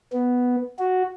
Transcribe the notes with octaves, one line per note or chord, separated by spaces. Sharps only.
B3
F#4